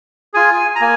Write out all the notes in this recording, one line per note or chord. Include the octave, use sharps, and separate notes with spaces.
F4 G#4 G#5
A#5
A#3 G#5